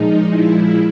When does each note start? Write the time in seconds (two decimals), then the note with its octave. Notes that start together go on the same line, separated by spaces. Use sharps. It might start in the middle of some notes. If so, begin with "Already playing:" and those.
Already playing: A#2 F3 G#3 D#4
0.27 E4